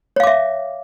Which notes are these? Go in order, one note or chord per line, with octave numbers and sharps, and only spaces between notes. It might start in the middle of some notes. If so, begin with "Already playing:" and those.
C#5 E5 F5 D6